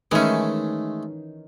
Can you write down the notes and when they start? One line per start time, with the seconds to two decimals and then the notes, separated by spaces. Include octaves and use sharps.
0.11 D#3 E3 G#3 A3 C#4 G#5